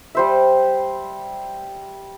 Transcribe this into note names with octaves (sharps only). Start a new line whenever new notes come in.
G3 C5 E5